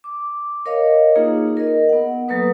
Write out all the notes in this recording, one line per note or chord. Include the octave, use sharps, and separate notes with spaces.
D6
A#4 C#5 D#5 F5
A#3 D#4 F4 G#4
A#4 D#5
B3 F#5
F#3 A#3 A4 B4 D#6